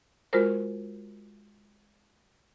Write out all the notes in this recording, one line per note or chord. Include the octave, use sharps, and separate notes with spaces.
G#3 F4 F#4 A#4 C5